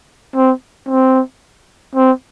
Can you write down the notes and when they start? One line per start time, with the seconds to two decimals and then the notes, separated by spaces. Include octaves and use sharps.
0.36 C4
0.89 C4
1.96 C4